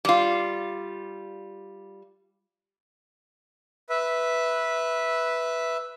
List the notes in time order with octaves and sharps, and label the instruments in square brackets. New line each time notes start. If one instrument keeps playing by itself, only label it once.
[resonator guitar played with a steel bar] G3 F4
[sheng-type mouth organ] B4 E5